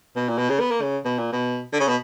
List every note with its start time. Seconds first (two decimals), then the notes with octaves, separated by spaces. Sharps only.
0.16 B2
0.28 A#2
0.38 B2
0.49 C#3
0.60 B3
0.71 A#3
0.82 C#3
1.05 B2
1.18 A#2
1.32 B2
1.73 D3
1.80 C#3
1.88 B2